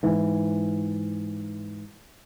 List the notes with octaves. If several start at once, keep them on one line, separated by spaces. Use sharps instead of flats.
G#2 E3